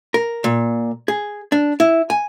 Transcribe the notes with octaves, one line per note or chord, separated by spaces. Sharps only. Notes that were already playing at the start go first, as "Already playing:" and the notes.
A#4
A#2
G#4
D4
E4
G#5